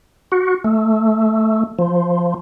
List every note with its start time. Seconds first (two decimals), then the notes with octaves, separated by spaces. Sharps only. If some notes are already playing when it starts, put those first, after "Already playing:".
0.32 F#4
0.64 A3
1.79 F3